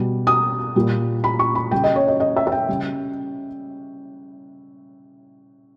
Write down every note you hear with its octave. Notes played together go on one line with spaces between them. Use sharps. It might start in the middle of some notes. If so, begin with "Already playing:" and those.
Already playing: B2 G3
D#6
A#2 G3
B5
C#6
B5
C#3 G3 G5
D#5
C#5
D#5
D#5
E5
E5
G5
C#3 G3